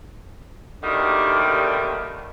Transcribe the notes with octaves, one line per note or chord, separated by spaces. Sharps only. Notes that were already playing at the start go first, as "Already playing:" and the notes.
D#2 B2 D3 D#3 G3 A3